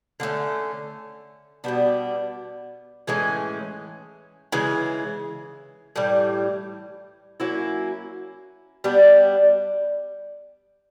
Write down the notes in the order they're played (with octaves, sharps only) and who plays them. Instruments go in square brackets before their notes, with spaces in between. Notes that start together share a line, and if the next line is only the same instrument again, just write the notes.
[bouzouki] D3 F3 A3 C#4
B2 G3 B3 D4
A2 E3 G#3 C#4
C#3 E3 G#3
A2 E3 G3
F#3 A#3 C#4 E4
G3 B3 D4